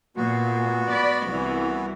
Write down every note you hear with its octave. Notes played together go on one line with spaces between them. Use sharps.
A#2 B3 F#4
D5 B5
C2 E3